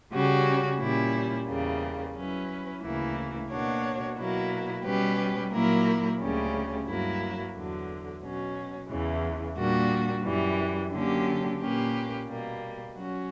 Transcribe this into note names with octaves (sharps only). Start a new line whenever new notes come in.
C#3 G3 C#4 F#4
A#2 G3 C#4 E4
E2 C#3 G3 A#3
F#3 C#4 E4 B4
D2 C#3 E3 A#3 E4
B2 A#3 D4 F#4 C#5
B2 F#3 A#3 E4
B2 G3 C#4 G4 B4
A#2 F#3 A#3 E4 A#4
D2 C#3 G3 C#4
G2 F#3 A#3 E4
E2 D3 F#3
B2 F#3 C#4
E2 C#3 E3
A#2 G3 A#3 D4 F#4
F#2 E3 G3
D3 F#3 A#3 C#4 G4
A#2 A#3 C#4 G4 B4
B2 G3 A#3
F#3 C#4 F#4